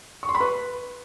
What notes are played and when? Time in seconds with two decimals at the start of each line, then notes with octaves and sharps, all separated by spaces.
0.23 C#6
0.29 C6
0.35 B5
0.40 B4